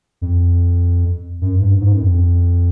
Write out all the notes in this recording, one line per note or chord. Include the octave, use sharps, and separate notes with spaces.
F2
F#2
G2
G#2
F#2
F2